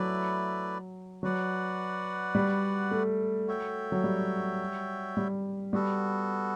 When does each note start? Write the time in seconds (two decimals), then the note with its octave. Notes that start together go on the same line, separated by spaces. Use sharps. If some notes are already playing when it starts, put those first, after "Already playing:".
Already playing: F#3 A3 E4 B4 D5
1.23 F#3 F#4 B4 D5 F#5
2.35 G3
2.91 A3
3.47 F#4 C#5 E5 G5
3.92 F#3
4.04 G3
5.17 G3
5.73 G3 B3 F#4 A4